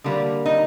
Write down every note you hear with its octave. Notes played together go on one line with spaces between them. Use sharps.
D3 G3 A#3
D#4